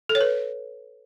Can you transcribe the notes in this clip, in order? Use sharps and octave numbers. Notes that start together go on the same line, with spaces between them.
A4
C#5
B4